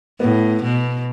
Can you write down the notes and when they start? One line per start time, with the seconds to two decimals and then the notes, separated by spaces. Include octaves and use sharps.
0.20 A2 B3
0.62 B2